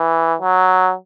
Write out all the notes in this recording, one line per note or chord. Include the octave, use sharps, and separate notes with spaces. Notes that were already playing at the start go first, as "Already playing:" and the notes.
Already playing: E3
F#3